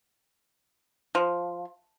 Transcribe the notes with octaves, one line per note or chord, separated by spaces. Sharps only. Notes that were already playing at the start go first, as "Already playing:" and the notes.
F3